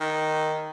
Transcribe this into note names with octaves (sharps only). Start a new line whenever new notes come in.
D#3